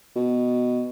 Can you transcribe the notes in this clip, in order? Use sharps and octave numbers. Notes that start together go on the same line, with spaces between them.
B2